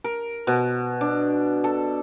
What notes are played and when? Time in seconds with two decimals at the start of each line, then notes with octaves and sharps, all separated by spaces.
0.04 A#4
0.47 B2
1.01 D4
1.64 A4